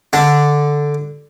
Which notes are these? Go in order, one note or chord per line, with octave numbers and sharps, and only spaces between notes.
D3 D4